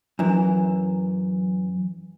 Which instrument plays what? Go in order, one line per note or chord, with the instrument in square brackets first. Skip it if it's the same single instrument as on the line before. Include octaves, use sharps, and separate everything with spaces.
[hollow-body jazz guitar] F#2 E3